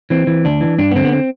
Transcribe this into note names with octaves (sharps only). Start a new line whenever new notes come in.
E3 C4
E3
D2 D4
E3
G2 D4
B3
D3 C4
B3
C4